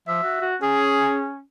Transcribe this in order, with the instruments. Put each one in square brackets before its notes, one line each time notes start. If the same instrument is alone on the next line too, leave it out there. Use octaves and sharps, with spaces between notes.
[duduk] F3 [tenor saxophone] E5
[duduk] F#4
F#4
[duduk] C#4 [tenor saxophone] G#4